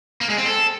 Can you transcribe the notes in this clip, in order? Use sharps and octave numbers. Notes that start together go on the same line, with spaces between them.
A#3
G#3
C4
A4